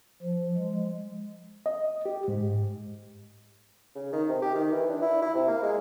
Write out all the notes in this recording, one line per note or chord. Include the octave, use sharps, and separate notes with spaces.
F3
G#3
D#5
G4
G#2
C#3
D#3
C3
G4
D#3
E3
D4
E4
E4
C3
A#3
G#3